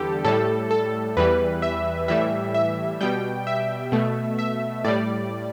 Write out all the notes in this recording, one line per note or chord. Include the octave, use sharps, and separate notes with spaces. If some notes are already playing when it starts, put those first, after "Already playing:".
Already playing: E2 D3 G3 G4 A4
A2 G3 A4
A4
E2 E3 G3 B4
E5
A2 E3 G3 E5
E5
B2 G3 G5
E5
B2 A3
E5
A2 G3 D5